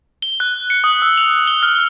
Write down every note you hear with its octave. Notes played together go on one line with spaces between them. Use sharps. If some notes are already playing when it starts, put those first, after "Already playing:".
G7
F#6
C#7
D#6
E6
F7
G7
F6